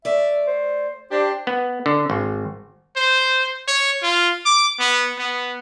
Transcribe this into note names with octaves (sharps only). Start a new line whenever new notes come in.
A3 D5 E5
C5
D4 G4 C5
B3
D3
G#1
C5
C#5
F4
D6
B3
B3